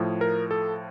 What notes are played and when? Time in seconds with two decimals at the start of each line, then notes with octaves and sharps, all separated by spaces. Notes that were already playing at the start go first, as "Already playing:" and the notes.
Already playing: A2 F3
0.21 A#4
0.51 A4